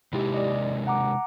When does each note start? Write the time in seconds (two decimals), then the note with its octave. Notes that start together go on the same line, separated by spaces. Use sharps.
0.13 C3 G#3 D#4 E4 G4
0.34 D5 D#5
0.87 F#5 A#5 D6